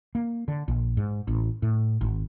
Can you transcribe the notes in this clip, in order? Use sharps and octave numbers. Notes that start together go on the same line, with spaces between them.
A#3
D3
A#1
G#2
A1
A2
G#1